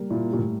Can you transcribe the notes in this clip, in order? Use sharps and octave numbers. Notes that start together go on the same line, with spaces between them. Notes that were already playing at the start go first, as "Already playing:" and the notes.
Already playing: G3 A#3
A#2 E4
A#2 G4
A2